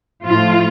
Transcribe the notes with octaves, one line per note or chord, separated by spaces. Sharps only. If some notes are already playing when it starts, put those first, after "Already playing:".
A2 F3 A3 F4